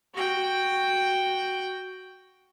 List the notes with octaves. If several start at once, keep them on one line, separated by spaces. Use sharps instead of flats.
F#4 G5